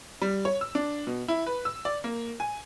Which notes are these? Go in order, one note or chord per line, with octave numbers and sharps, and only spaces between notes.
G3
C#5
E6
D4
B2
E4
B4
E6
D5
A#3
G#5